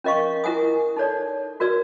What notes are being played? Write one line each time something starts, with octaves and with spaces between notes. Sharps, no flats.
C#4 A#4 D#5 F5 C#6
E4 A#4 F#5 G#5 D#6
D#4 A4 C#5 D5
F#4 A#4 B4 D5 E6